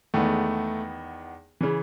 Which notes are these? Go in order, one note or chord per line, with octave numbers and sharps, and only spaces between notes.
E2 D#3 G#3 A3 B3
C#3 E3